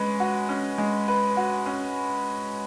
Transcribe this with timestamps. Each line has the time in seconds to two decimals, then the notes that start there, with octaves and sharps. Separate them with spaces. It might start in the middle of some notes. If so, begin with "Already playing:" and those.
Already playing: G#3 C#4 B4
0.20 F#4
0.49 C#4
0.78 G#3
1.08 B4
1.37 F#4
1.66 C#4